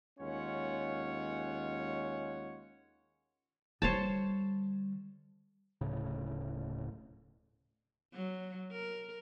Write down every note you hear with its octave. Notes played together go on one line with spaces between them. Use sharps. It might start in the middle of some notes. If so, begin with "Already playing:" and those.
D#2 G#3 C#4 F4 C#5 F#5
D3 G3 C5 C#5 A5
D1 A2 C#3
F#3
A#4